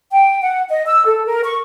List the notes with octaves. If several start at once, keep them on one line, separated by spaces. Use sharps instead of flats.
G5
F#5
D#5
E6
A4
A#4
C#6